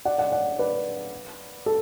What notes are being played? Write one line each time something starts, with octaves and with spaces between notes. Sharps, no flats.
D5 F#5
D5 F#5
D5 F#5
B4 D5
A4